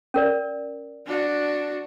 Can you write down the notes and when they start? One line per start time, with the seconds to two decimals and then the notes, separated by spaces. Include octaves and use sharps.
0.14 C#4 A#4 D5
1.06 D4 F#4